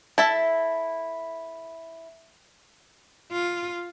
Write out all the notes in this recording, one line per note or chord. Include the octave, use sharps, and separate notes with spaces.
E4 A4 E5 A5
F4